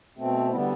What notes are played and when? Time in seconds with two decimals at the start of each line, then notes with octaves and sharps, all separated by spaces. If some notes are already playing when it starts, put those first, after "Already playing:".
0.17 B2 A3 C4
0.50 D3 G3 B3 C4 E4